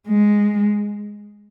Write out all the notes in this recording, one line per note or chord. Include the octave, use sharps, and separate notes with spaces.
G#3